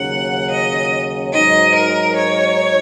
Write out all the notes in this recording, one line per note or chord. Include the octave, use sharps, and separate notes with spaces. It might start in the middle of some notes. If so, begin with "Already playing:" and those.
Already playing: D#2 C#3 F#3 C#4 F#5
D#5
G#2 F#3 D#4 D#5
A#4
C#5